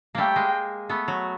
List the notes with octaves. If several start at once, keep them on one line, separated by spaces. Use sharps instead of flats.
G3 A3 A#3 G5
G#3 A#3
A3 B3
F#3